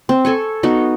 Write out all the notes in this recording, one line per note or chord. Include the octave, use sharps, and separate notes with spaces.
C4
A4 G#5 C#6
B3 D#4 F#4